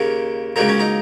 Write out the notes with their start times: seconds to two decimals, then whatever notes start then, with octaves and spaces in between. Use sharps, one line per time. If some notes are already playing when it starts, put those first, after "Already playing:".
Already playing: D#2 C#3 A#3
0.56 C#2 C#3 F#3 A#3 D#4
0.69 C#4
0.79 D#4